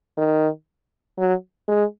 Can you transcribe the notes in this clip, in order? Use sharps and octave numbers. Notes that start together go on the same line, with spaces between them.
D#3
F#3
G#3